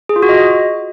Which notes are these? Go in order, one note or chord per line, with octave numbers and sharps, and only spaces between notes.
G#4
F4
F#4
D#5